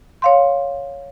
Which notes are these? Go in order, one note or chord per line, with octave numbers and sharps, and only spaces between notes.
C#5 F5 C6